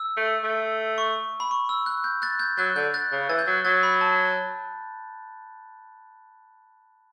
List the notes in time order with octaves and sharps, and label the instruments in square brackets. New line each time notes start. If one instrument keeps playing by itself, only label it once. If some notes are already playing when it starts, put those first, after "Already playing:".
Already playing: [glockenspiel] E6
[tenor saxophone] A3
A3
[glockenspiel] C#6
B5
C#6
E6
F#6
G6
F#6 A6
G6
[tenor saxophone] F#3 [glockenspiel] F#6 A6
[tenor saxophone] D3 [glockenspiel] G6
[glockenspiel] F#6 A6
[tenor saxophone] C#3
[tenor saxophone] E3 [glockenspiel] A6
[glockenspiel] G6
[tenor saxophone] F#3
[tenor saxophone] F#3 [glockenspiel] F#6 A6
[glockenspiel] B5
A5